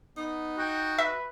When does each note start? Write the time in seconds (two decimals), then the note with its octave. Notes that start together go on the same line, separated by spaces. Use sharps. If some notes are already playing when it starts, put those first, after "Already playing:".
0.17 B3 D#4
0.58 F#4 G5
0.98 B4 E5